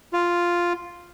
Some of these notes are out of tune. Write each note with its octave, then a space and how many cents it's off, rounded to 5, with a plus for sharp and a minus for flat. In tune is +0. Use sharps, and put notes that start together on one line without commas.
F4 +0